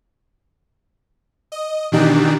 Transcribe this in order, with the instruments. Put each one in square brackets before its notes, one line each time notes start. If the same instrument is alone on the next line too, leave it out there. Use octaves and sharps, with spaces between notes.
[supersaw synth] D#5
B2 D#3 E3 D4 D#4 G4